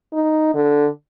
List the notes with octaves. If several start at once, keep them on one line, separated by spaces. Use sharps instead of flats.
D#4
D3